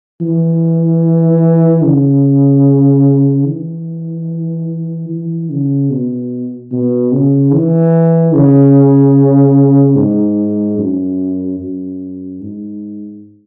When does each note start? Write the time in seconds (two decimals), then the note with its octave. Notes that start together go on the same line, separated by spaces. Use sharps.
0.21 E3
1.83 C#3
3.46 E3
5.09 E3
5.50 C#3
5.90 B2
6.72 B2
7.12 C#3
7.53 E3
8.34 C#3
9.97 G#2
10.78 F#2
11.60 F#2
12.41 G#2